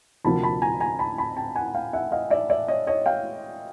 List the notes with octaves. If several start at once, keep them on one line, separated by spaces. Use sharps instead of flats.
D2 C3 F3 A#3 A5 B5
A5 B5
G#5 A#5
G#5 A#5
A5 B5
A5 B5
G5 A5
F#5 G#5
F5 G5
E5 F#5
D#5 F5
D5 E5
D5 E5
C#5 D#5
C#5 D#5
F5 G5